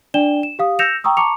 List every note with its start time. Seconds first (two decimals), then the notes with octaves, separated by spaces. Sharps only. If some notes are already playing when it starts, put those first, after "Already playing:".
0.14 D4 D5 G5 E7 G7
0.43 E7
0.59 G4 F5 D#6
0.79 E6 G6 A#6 C#7 E7 F7
1.04 G5 A#5 C#6 D#6 E6
1.17 A5 A#5 C#6 D6 C#7 F7